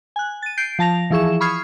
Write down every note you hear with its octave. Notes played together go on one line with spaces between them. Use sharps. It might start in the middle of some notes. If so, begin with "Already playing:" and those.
G#5 F#6
A6 D#7
G6 C7 D7
F3 A5 A#6 F7
E3 F3 E4 G#4 C#6 E7
B5 C#6 D#6 F6 G#6 C7